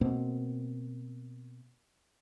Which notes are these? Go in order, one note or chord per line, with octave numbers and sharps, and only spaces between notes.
B2 A#3 C4